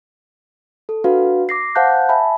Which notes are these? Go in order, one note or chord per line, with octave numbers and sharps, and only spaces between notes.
A4
D4 F#4 B4 F5
D6 A#6 C7
C5 F5 F#5 A5 F#6 G6
E5 G#5 A5 B5